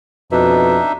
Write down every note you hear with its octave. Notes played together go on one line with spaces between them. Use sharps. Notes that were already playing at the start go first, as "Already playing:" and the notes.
F2 B2 D4 D#4 E5